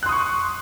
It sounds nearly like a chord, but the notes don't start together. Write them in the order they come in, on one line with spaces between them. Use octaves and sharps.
F#6 C6 D#6 C#6